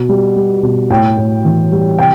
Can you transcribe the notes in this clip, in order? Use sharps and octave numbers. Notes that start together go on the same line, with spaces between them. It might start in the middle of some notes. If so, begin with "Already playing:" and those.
Already playing: B2
G3
G3
B2
A2 G5
A2
E3
G3
C3 G5